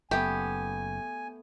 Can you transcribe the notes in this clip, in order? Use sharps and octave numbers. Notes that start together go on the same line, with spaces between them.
F#1 A3 B3 G4 G#5